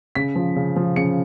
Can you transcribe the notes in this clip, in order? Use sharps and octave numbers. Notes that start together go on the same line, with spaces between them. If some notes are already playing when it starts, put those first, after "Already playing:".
C#3 B6
F3
C#3
F3
C#3 C#7